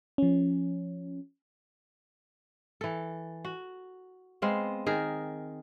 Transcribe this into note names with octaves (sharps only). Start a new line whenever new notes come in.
F3 C#4
E3 A4
F#4
G#3 B3 C4 F5
D#3 G#4 A#4